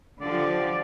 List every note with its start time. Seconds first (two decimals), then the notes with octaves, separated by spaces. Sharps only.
0.21 D3 F3 G4 D5